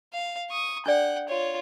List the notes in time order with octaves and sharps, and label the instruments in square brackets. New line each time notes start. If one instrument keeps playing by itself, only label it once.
[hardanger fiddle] F5
C#6 D#6
[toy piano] D4 A4 D5 [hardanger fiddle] F#5 G5
[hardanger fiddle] F4 C#5